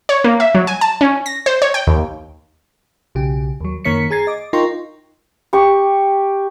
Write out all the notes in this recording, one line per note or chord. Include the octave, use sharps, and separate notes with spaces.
C#5
A#3
E5
F#3
G#5
A5
C#4
A#6
C5
C#5
G5
D#2
B1 C#3 G4
D#2 F#3
F#2 D#3 A#3 C#5 B6 C#7
G#4 A#5 G#6 A6 C7
D#5 D6
D#4 F4 A#4 G5 C6 C#6
G4 C#6